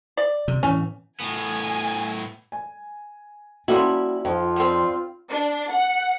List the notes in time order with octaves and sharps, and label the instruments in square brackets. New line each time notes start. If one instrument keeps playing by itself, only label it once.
[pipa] D5
[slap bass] C3
[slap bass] A2 E3 [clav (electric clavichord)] C#4
[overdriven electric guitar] A2 B3 [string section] G#5
[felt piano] G#5
[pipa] F3 G3 E4 [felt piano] A#3 C#4 [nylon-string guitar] F#4
[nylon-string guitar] F2 [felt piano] D#4 C5 [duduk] F4
[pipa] G3 C4
[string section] D4
F#5